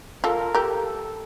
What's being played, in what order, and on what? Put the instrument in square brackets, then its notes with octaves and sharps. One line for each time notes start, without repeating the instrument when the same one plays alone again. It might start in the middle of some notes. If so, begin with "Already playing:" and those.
[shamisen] F4 A4 [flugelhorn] A#4
[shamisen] G4 A#4 [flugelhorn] A4
[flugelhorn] A4